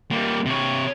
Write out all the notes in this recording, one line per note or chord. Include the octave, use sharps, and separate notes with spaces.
G3 A#3
C3 C#5